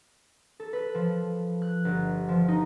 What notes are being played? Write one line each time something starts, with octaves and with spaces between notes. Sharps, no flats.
A4
B4
F3
F#6
G1
F3
D#4